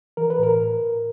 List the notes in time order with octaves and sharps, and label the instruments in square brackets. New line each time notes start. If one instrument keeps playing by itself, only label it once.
[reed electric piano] E3 A#4
B4
A2 A#4